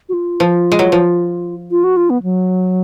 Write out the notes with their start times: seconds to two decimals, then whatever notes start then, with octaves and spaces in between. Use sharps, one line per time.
0.09 F#4
0.13 F4
0.40 F3
0.72 G#3
0.79 F#3
0.92 F3
1.71 F4
1.84 F#4
1.97 F4
2.10 B3
2.23 F#3